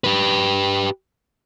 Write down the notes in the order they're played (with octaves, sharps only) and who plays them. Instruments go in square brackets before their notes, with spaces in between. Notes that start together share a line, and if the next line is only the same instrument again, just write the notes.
[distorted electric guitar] G4 B4